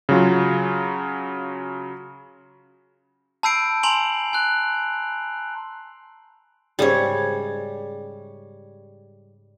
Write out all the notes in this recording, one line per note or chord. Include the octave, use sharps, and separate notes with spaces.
C#3 F#3 F4
A5 B5 E6 G6 C7 D7
G#5 A#5 C6 D7 F7 F#7
G#5 C6 F#6
G#2 C#3 G3 G#4 C#5